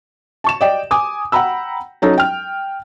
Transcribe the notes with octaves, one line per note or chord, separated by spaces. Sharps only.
A5 C#6 E7
D5 D#5 G5
G#5 D6 D#6
F#5 G5 A#5 B5 E6
F#3 C#4 D#4 F#4 A4
G5 F6